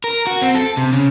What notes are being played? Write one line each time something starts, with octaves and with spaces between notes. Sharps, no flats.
A#4
F#4
C4
A4
C3
C#3